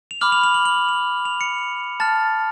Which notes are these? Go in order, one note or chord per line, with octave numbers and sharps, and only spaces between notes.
F7
B5 D6 F6 F#7
F7
F7
F#7
F#7
F7
F7
C#7
A5 F6 A6